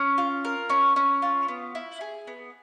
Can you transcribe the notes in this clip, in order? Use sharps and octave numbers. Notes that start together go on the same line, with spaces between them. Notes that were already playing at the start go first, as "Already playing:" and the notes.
Already playing: C#4
F4
A#4
C#4
C#4
F4
B3
E4
G#4
B3